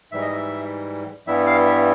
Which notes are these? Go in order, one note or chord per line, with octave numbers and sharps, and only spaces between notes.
G#2 E3 G3 E5
D#5
E5
G2 E3 G3 B3 E4 E5
F5
E5